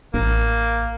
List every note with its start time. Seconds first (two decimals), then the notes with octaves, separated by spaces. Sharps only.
0.14 A1 A#3